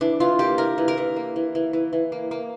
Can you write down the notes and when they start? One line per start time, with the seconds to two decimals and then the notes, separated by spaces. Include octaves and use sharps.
0.01 E3 D4
0.20 E3 F4
0.39 A#3 G4
0.58 E3 A#4
0.78 E3
0.88 A#4
0.97 E3
1.16 A#3
1.36 E3
1.55 E3
1.73 E3
1.93 E3
2.12 A#3
2.31 A#3